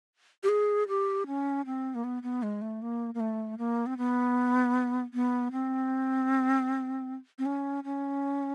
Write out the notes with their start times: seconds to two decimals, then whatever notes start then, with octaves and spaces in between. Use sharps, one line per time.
0.43 G4
0.49 G#4
0.88 G4
1.27 C#4
1.66 C4
1.95 A#3
2.04 B3
2.23 B3
2.43 G#3
2.62 A3
2.82 A#3
3.14 A#3
3.20 A3
3.58 A#3
3.86 C4
3.97 B3
5.14 B3
5.52 C4
7.39 C4
7.46 C#4
7.84 C#4